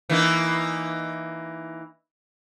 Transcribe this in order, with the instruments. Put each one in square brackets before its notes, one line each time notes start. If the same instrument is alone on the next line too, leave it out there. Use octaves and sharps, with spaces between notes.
[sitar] E3 A#3 D#4